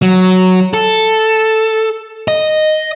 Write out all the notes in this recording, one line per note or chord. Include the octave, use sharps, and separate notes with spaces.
F#3
A4
D#5